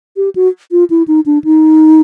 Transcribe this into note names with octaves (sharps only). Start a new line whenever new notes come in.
G4
F#4
F4
E4
D#4
D4
D#4